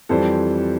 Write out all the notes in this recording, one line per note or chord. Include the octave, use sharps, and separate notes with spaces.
F2 E3 G3 A4 C5